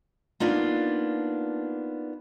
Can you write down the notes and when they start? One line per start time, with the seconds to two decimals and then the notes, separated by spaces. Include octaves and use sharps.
0.40 A#3 B3 D4 D#4 F4